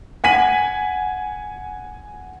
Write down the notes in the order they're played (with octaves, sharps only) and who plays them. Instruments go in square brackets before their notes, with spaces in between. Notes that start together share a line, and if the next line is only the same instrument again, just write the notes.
[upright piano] F#5 G#5 B6 D#7 F#7